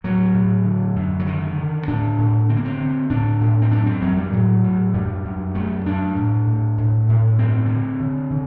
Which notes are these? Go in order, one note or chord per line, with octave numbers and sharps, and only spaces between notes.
A2 F#3
A2
D3
F#2
F#3
D3 D#3
D3
A2 D4
A2
D3 C4
A#3
C4
D3
A2 D4
A2
C4
F#2 D4
C4
F#2 F#3
G3
A2 F#3
A2
F#2 G3
F#2
F#2 A3
F#2 D4
A2
A2
A2
A2
G2 C4
D3
D3
D3